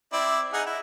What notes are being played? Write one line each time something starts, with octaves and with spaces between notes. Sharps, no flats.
C4 E4 D5
D#4 G#4 F#5
E4